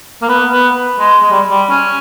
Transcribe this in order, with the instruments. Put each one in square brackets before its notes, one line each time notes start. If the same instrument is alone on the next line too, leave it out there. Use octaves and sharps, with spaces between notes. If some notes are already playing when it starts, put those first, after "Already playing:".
[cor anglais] A#3
B3
B3
G#3
G#3
G3
G3
C#4